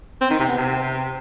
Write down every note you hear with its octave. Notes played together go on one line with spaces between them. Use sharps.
C4
D#3
C3
B3
C3